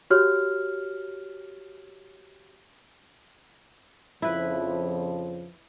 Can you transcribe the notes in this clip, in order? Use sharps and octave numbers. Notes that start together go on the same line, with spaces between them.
F#4 G4 C#5 F6
F2 C#3 F3 E4 B4